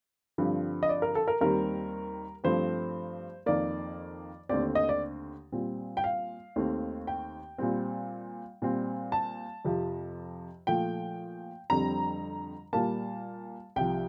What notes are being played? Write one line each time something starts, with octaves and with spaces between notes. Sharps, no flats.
G2 D3 F3 C4
D#5
D5
A#4
A4
A#4
D#2 D#3 G3 C4 A#4
G2 F3 A3 C4 C5
F2 D#3 A#3 D5
D#2 D3 A3 C4 D5
D#5
D5
A#2 G3 C4
G5
F5
D#2 D#3 A3 C4
G5
A#2 G3 C4
A#2 G3 C4
A5
F2 C3 F3
A#2 F3 A3 G5
F2 D3 G3 C4 A#5
A#2 G3 A#3 A5
C2 C3 F3 G5